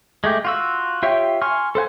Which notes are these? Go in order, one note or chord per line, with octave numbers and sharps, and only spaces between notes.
G#3 A3 G4
F4 F#4 E6
F4 G4 C#5 E5 G5
G#5 C6 C#6 F6
A4 C5 F#5 G#5